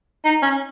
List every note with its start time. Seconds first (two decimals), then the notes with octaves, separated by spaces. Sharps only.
0.25 D#4
0.42 C#4